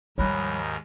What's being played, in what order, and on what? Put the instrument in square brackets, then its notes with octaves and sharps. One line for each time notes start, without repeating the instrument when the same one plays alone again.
[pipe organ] D#2 G#2 A#4 [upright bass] F3 G3 [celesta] C#5 B5 F#6